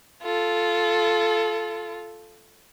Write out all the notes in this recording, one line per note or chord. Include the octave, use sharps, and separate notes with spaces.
F4 A4